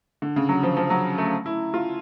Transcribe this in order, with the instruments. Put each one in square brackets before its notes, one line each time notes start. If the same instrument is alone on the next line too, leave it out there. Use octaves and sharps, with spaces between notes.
[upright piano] D3
C#3
F#3
F3
F3
F#3
A3
E4
F4